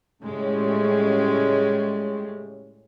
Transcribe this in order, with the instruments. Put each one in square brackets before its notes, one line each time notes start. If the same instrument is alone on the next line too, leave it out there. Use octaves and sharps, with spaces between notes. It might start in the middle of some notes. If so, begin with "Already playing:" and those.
[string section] A2 C#3 G3 G#3